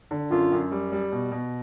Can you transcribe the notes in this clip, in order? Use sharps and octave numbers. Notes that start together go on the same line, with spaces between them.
D3
F#2 F4
F#2
G3
G3
B2
B2